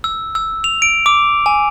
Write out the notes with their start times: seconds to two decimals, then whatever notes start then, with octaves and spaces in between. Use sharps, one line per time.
0.04 E6
0.35 E6
0.64 F7
0.82 D7
1.06 D6
1.46 G#5